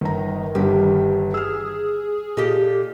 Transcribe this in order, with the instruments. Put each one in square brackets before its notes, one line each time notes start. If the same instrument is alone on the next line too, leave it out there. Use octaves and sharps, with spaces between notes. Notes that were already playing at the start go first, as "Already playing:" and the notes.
[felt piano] G1 A#5 [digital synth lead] D#3
[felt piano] G1 G2 D3 [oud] G4
[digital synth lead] G#4 [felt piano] E6 F6
[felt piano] A#2 [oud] G4 A4 D#5